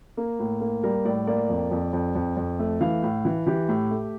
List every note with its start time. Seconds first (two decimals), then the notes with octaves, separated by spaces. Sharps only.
0.17 A#3
0.39 A2
0.61 A#3
0.83 G3 A#4
1.05 A2 D5
1.27 A#3 D5
1.49 F2
1.71 F2
1.93 F2
2.15 F2
2.37 F2
2.59 A3
2.81 E3 F5
3.03 A2
3.25 E3
3.47 E3 G4
3.68 A2
3.91 A3